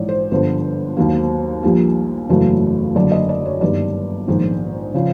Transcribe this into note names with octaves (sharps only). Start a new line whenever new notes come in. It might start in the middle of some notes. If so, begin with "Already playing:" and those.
Already playing: A#1 G#2 E3 C#5 D5
C5
G1 G2 D3 F3 C5
D#2 D#3 F#3 A#3
A#1 A#2 G3 A#3
F#1 E2 C#3 F#3 A3
F#1 F#2 D3 D5
D#5
D5
C#5
G1 G2 D#3 G3 D5
A#1 G#2 D#3 G#3
C#3 F3